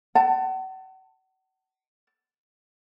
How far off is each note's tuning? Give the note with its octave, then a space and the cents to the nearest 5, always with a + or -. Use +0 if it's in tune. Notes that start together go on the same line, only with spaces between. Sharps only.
F#5 +40 A5 +20